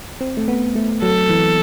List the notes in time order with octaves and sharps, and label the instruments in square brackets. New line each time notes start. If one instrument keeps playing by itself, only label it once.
[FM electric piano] C4
A3
B3
A3
[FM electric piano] F#3 [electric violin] A4
[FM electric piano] E3